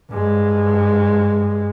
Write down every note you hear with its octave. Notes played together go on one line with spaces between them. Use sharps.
G2 G#3